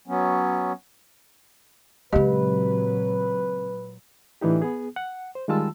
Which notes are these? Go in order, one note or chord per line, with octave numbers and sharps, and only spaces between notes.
F#3 B3 C#4
A#2 C#3 F#3 G#3 C4 G4 B4 D#5
A2 E3 D4 D#4 G4
B3 G#4
F#5
C5
D#3 G3 G#3 F4 A5 E6